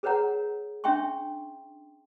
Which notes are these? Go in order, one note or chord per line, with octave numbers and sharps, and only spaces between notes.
G#4 A#4 B4 C#5 F#5 A#5
C#4 D4 E5 G5 C6 C#6